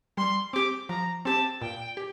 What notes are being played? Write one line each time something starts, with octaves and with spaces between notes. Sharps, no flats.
G3 C6
C4 G4 D6
F3 A#5
C4 G4 A5
A#2 G5
G4